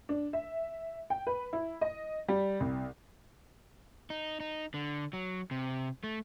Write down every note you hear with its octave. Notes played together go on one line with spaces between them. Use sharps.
D4
E5
G5
B4
E4
D#5
G3
C2
D#4
D#4
D3
F#3
C3
A3